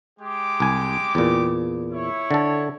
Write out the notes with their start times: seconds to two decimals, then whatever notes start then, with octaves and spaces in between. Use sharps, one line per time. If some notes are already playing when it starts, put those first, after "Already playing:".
0.19 G#3 G4 D6
0.60 C2 G#5
1.15 E2 A#2
1.91 E4 C#5
2.31 D3 A4